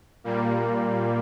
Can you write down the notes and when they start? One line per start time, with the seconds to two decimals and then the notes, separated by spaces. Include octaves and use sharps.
0.24 A#2 G3 A#3